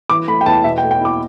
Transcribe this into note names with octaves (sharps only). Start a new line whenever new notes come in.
E3 D6
A3 B5
G5
E2 A5
B2 E5
G5
A3
G5
E4 D6